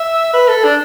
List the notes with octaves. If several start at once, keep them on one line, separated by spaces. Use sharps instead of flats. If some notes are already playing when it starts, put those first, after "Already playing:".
Already playing: E5
B4
A4
D4